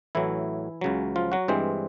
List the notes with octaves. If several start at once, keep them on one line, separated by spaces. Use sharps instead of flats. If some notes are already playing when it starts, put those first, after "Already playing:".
A1 A2 E3 F#3 E4
C#2 C#3 F#3
F3 F4
F#3 F#4
G2 E3 G#3 C4 C5